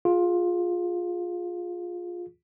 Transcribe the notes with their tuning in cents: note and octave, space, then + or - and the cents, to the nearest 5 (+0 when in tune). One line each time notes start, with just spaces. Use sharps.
F4 +15 G#4 +0